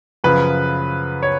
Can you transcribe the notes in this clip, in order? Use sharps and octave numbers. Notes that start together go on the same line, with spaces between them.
F#2 C#3 F3 B4
C#5